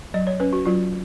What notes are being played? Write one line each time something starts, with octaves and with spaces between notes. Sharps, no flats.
F#3 D#5
C#5
C#4 B4
F#4
F#3 F4